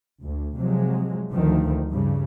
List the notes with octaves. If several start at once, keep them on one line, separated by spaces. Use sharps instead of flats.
D2
C3 F3 F#3 G#3
D2 D#3 F3
G2 C#3